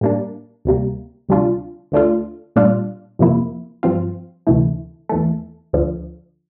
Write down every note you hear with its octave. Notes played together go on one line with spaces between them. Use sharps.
A2 G3 A#3 D4
D2 C3 G3 A#3
D2 C3 G3 D4 F4
D2 D3 A3 D4 F4
A#2 G3 D4 F4
F2 C3 F3 A#3 E4
G2 F3 C4 F4
D2 C3 E3 A3 E4
E2 E3 A3
D2 D3 F3